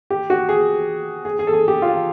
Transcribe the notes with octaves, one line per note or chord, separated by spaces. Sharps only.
G4
F#4
G#4
G#4
G#4
A4
G#4
G4
F4